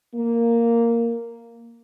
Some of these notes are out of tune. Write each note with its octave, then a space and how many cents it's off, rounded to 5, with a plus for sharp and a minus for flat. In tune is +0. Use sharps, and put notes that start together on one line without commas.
A#3 -5